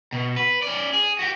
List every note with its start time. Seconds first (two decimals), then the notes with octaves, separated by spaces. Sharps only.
0.13 B2
0.37 B4
0.62 C#4 D5
0.93 G#4
1.19 F#4 G4